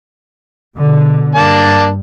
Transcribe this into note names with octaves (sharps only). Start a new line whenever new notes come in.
B2 D3
G2 A#3 D4 A5